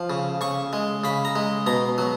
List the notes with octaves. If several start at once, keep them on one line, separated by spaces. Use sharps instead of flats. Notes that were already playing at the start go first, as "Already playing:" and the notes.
Already playing: F3
C#3
C#3 C#6
G#3
C#3 B5
A#5
G#3
B2 A#5
F#3